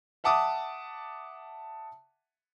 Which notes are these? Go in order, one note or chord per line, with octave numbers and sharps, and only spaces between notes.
E5 F#5 A5 D6 D#6